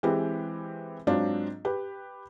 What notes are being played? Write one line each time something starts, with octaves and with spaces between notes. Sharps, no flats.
E3 G#3 C4 G4 B4
G#2 F#3 C4 D4 F4
G4 B4